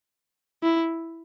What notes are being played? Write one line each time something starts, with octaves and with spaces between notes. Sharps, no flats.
E4